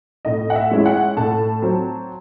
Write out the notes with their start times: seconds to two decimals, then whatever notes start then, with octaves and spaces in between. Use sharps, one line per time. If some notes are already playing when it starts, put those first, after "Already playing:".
0.25 A2 D#5
0.50 F#5
0.55 E5
0.71 G#3 C#4 E4
0.86 F#5
1.17 A2 A5
1.62 F#3 C4